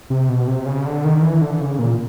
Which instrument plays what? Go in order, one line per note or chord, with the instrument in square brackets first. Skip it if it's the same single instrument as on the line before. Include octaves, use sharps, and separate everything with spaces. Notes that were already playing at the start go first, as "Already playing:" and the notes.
[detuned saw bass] C3
B2
C3
C#3
D3
D#3
E3
D3
C#3
A#2